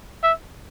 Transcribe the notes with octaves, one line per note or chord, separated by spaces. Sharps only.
E5